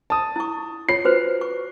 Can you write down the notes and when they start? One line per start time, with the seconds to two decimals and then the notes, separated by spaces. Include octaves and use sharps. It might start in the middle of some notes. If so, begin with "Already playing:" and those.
0.10 A5 D#6
0.36 E4 C#6
0.89 F4 C#5 C7
1.05 F#4 B4 C5
1.41 C#6